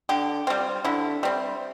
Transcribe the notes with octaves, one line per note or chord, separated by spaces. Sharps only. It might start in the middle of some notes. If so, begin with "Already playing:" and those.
D3 G4
G3 C4 F4
D3 E4
G3 C4